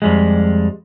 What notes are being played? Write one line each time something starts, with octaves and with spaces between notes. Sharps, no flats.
F2 G3 G#3